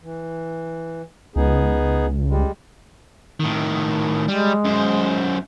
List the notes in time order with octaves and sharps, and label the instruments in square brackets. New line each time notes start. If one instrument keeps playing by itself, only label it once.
[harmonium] E3
[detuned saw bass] C#2 [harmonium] B3 D#4 G#4
[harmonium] G3 G#3
[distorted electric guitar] A2 D#3
[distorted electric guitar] G3 [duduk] G#3
[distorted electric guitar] F#2 C5